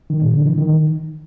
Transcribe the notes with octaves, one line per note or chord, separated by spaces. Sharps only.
D#3
A#2
D3
E3
D#3